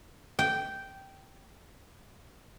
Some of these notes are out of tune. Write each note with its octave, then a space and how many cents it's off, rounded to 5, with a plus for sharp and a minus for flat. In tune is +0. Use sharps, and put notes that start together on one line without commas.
G5 -10